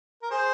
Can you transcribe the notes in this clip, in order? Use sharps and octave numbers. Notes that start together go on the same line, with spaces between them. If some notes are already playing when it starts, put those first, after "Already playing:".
A#4
G#4 C5